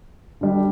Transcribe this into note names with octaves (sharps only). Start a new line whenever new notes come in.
D3 G3 D4